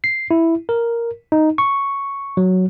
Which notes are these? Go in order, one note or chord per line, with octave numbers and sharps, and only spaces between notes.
C7
E4
A#4
D#4
C#6
F#3